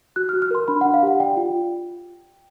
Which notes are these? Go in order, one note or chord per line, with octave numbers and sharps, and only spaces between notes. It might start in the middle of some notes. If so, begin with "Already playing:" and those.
F#4 F#6
F6
F#4
F6
A#4 C6
D4 B5
F#5
D4
F5
G4 F#5
D5 G5
F4